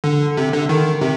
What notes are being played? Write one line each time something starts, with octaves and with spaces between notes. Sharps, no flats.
D3
C3
D3
D#3
C3